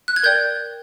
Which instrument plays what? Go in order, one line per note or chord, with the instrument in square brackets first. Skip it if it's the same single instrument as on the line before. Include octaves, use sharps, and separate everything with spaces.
[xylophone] F#6
G#6
A#4 D5 G5 G6